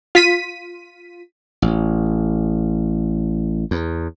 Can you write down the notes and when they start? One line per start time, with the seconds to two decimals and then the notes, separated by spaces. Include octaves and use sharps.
0.15 F4 B6 D#7
1.62 A1
3.71 E2